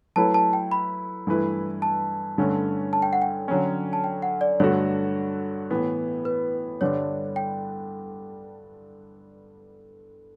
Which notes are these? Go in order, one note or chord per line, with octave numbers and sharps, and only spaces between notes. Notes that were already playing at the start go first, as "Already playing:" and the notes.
F#3 A3 E4 B4 A5
A5
G5
B5
G2 E3 A3 E4 B4
A5
G2 D3 A3 C#4
A5
G5
F#5
G5
D3 F#3 C#4
A5
G5
F#5
D5
G2 D3 A3 D4 F#4 C#5
A2 E3 B3
B4
G2 D3 G3 D4 C#5
G5